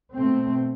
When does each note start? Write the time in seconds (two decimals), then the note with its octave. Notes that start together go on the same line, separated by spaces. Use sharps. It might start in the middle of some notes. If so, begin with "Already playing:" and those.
0.13 B2 A3 C4